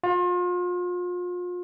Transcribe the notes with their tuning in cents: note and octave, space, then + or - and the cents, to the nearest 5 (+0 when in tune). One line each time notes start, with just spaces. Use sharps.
F4 +35